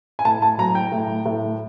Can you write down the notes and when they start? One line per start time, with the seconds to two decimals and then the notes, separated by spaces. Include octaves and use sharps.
0.19 G#5
0.25 A2 A5
0.42 A5
0.58 F#3 A#5
0.75 G5
0.92 A2
1.26 A2